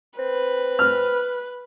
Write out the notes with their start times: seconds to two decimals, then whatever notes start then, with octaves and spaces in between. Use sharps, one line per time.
0.19 C4 B4
0.79 F6